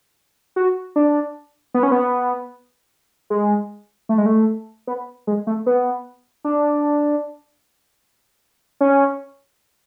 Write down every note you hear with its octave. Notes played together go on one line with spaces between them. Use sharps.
F#4
D4
B3
C#4
B3
G#3
A3
G#3
A3
B3
G#3
A3
B3
D4
C#4